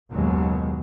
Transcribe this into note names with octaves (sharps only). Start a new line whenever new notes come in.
F#1 D#2 B2 D#3 F#3 G#3